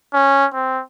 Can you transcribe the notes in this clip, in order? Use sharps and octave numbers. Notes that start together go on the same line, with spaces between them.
C#4
C4